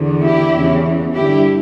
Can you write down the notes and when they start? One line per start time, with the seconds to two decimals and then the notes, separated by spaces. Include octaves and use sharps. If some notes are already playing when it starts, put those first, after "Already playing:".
Already playing: E2 D3
0.22 E4 G4
0.53 E2 C#3 E3
1.14 G2 D3 E4 G4